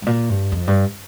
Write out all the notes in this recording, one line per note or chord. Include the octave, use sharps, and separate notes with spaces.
G2
A#2
G2
F2
G2